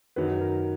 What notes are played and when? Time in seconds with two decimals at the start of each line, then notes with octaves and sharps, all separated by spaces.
0.16 F#2 D#3 F#3 B4
0.41 A#4